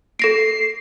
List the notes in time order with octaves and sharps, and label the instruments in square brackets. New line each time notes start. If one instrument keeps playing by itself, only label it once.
[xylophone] A4 A#6 D7 [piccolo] C7